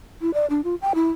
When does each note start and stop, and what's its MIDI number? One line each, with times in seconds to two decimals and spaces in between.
0.21 0.33 64
0.34 0.46 74
0.50 0.61 62
0.64 0.75 65
0.82 0.93 79
0.95 1.10 64